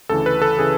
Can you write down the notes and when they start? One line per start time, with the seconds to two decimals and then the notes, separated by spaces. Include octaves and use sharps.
0.09 D2 C#3 E3 A4
0.26 B4
0.42 A4
0.58 C#3 E3 G#4